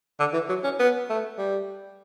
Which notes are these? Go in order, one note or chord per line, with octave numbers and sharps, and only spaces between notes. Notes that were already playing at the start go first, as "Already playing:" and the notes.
D3
E3
F#3
C#4
B3
A3
G3